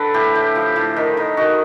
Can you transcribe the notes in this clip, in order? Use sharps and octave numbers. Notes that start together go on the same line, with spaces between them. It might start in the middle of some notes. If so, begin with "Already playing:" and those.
Already playing: D3 A4 B4
A2 G4
A2
F3
A2
D#3
D#3
D#3 F#4